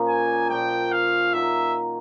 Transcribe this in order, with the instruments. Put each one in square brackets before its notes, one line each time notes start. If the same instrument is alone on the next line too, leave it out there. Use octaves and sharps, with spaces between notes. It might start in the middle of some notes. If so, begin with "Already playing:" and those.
Already playing: [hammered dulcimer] A#2 F3 A#3 C#4
[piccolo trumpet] G#5
[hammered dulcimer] A#2 F3 A#3 C#4 [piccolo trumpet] G5
[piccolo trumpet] F5
[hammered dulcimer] D#3 F#3 A#3 [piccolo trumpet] E5